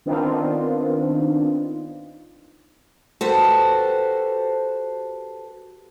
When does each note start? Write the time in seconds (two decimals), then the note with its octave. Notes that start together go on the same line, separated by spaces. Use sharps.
0.06 D#3 B3 C4 D4 D#4 F4
3.21 F#4 G4 A4 B4 C5